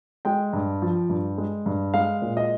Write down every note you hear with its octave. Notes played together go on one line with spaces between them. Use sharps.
G#3 G5
G2
F3
G2
G#3
G2
G#3 F5
A#2
D#5